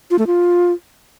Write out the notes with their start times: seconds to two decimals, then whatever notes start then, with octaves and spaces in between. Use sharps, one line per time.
0.11 F4
0.19 A3
0.27 F4